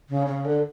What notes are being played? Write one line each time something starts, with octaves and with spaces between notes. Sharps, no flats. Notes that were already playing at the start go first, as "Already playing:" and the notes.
C#3
C#3
D3